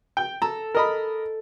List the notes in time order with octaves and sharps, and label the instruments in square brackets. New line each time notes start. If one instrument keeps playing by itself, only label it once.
[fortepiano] G5
[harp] A4 [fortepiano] A#5
[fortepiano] A#4 D#5 B5